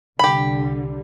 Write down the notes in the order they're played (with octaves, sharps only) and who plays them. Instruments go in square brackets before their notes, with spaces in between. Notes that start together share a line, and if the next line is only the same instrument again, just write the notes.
[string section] C2 D3 G3 [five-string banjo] G4 B5